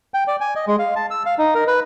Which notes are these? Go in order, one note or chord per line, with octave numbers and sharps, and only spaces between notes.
G5
D5
G#5
D#5
G#3
F5
A5
E6
F5
D#4
A#4
B4